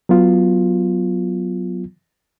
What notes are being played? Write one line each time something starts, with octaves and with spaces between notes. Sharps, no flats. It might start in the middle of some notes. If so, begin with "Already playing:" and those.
F#3 B3 F4